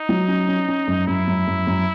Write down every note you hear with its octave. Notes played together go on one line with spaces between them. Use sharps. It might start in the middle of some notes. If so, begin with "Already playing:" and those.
Already playing: D#4
F#3
C#4
C#4
C#4
F#2
F#2 E4
F#2
F#2
F#2